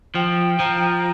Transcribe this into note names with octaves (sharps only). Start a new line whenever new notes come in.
F3 G5
F3 A#5